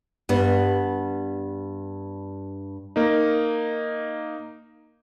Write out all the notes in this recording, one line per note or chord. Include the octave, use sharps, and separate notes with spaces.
G2 G3 B3
A#3 D#4